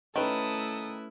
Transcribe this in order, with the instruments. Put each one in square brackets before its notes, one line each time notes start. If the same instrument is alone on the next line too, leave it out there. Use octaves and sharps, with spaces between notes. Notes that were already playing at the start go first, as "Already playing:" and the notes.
[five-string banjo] D#3 [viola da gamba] A3 E4 [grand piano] C#4 B4 [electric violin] A4 D#6